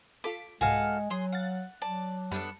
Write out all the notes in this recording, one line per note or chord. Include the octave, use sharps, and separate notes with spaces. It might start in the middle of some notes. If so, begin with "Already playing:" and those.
F4 A4 D6 B6
C2 G#2 G#3 F#4 A4 F5 G#5
F#3 G#4 C6
F5 F#5 A6
F#3 D5 A5
F#2 G3 B3 D4 A4